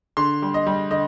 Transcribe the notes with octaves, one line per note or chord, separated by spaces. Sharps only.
D3 C6
G3
D#5
G3
D3 D#5